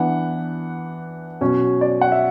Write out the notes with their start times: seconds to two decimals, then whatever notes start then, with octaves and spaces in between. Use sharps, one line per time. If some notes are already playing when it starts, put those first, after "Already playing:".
Already playing: E3 B3 D4 F#5
1.41 B2 F#3 C#4
1.81 D5
2.01 F#5
2.12 E5